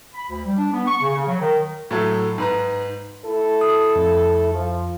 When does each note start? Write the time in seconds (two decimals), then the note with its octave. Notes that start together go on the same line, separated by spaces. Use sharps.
0.14 B5
0.29 D2
0.46 G3
0.58 D4
0.73 B3
0.87 C#6
1.01 C#3
1.14 C#3
1.28 F#3
1.41 D#3
1.91 A2 F#3 A3
2.38 G#2 B4 A#5
3.24 A3 E4 A4
3.61 D#6
3.96 F2
4.53 F3